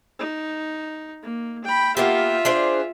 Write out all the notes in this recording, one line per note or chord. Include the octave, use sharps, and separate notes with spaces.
D#4
A#3
G5 B5
A#3 B3 F4 G4 E5
D4 G#4 C5